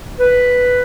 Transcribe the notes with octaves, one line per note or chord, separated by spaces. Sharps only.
B4